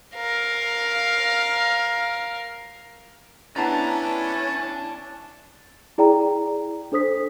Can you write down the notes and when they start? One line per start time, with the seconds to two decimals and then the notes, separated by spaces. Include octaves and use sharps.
0.15 A#4 F5
3.56 B3 C#4 D4 E4 D5 A5 A#5
5.98 E4 G#4 D5 G5 A#5
6.92 D4 A4 C5 D#6 B6